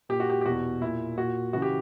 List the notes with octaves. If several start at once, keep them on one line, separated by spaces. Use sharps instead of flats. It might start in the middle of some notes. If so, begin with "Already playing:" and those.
A#2 G4
F#4
G4
G4
E2 B2 F#4
A#2 E4
A#2 F#4
C#3 E3 F#4
G4